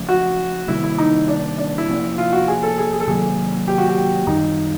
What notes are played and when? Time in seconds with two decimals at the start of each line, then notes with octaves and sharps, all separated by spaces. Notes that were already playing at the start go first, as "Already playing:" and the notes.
Already playing: C#3 F3 A3 C#4
0.09 F#4
0.68 C3 D#3 G3 A#3 E4
0.83 E4
0.98 D#4
1.28 D4
1.58 D4
1.78 E4
1.88 C3 F3 A#3 C#4
2.18 F4
2.33 F#4
2.48 G#4
2.63 A4
2.78 G#4
2.93 G#4
3.00 A4
3.07 C3 D#3 F#3 A#3 G#4
3.68 G4
3.78 F#4
3.89 G4
4.27 F#2 D#3 G3 D#4